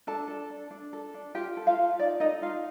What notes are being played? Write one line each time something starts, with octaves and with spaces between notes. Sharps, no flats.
D4 A4 A5
A4
D4
D4
A4
D4
F4 G4 G5
A4
F4 F5
F4
D#4 D5
D#4 A4 D#5
D#4 F4 F5